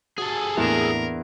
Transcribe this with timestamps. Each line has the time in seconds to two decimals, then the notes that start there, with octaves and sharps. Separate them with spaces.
0.18 F#4 G#4 A4
0.57 E2 A2 A#3 D4 A#4 E7